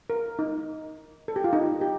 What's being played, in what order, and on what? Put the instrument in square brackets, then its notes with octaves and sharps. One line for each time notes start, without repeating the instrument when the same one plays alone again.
[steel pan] A#4
D#4
A4
G4
F4
D#4
G4